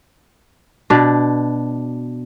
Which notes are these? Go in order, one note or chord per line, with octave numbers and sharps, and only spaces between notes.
B2 D4